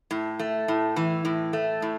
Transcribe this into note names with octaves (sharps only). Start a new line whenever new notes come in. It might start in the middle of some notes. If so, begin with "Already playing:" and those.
A2
A3
A2
E3
A2
A3
A2